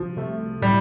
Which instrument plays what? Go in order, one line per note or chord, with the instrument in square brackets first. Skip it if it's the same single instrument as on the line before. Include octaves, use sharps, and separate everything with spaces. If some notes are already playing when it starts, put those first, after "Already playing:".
Already playing: [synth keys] C2 [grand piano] F3
[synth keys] C3 A3
[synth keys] A2 [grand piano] G3